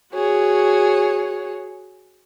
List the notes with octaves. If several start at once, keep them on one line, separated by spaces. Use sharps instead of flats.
F#4 G#4 C#5